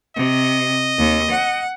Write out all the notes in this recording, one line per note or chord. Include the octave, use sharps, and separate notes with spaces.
C3 D#5
D#2
F#5